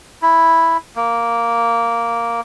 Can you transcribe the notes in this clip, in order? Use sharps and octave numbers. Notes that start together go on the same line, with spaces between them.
E4
A#3